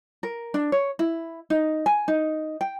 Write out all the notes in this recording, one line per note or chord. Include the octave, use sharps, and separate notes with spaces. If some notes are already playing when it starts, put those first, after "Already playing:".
A#4
D4
C#5
E4
D#4
G#5
D#4
G5